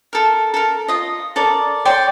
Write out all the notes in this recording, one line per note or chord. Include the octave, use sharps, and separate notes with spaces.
A4 A#4
A4 A#4
F4 D#5
A4 A#4 D5
C#5 D5 G5 C6